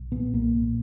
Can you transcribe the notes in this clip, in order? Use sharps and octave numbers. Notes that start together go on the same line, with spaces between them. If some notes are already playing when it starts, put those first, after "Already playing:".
Already playing: B1
A#2 B3
B1 A#3
A#2